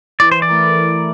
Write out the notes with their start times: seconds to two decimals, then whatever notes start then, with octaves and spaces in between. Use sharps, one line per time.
0.20 E3 D5
0.32 C5
0.42 D5
0.48 A3 E4 A#4
0.75 E3